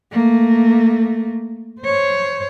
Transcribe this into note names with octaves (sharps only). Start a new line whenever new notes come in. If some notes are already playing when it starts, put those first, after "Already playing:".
A3 A#3
C5 C#5